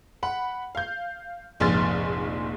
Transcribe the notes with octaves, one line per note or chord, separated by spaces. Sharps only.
F#5 B5
F5 G6
F1 A#1 G#2 C6 F6 A6